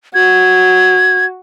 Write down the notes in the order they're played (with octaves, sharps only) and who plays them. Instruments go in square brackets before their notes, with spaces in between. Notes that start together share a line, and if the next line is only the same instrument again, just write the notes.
[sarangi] F#4 [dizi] G#6